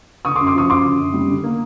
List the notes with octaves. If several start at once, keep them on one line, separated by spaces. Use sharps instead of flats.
D3 C#6 D#6
C6 D6
F#2
C6 D6
F3 C#6 D#6
F#2 C6 D6
D3
F#2
G3
D3
A#3